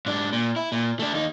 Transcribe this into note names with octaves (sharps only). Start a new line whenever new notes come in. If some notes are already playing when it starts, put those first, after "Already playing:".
G#2 D4
A#2
E4
A#2
A3 D4
D#2 D#4